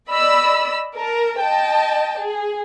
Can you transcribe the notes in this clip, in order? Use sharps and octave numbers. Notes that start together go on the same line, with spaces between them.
D5 D#5 B5 E6
A#4 A5
D#5 G5 A5
G#4